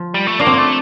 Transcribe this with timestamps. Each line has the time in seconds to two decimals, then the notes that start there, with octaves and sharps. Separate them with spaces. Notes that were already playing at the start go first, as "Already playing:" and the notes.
Already playing: F3
0.14 G3
0.27 A3
0.39 A#3 D4
0.46 C4
0.53 A3 D4